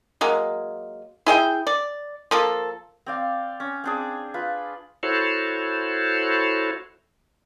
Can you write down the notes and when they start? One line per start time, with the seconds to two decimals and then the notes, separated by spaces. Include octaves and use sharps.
0.21 F#3 G#3 A#3
1.26 E4 G#4 D#5 G5
1.67 D5
2.31 F3 A#3 A4
3.06 C4 D5 F5
3.60 C#4
3.84 C4 D4 G#4
4.34 F4 B4
5.03 E4 F#4 A4 C5 C#5